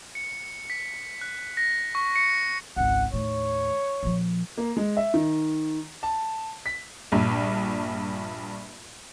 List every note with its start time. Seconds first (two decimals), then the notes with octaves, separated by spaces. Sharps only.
0.15 C#7
0.70 B6
1.21 F#6
1.57 A#6
1.95 C#6
2.16 C#7
2.77 G#1 C#2 F#5
3.13 D#2 A2 C#5
4.03 A#2 F3
4.57 A#3
4.77 G#3
4.97 E5
5.14 D#3
6.03 A5
6.66 B6
7.12 A#1 G2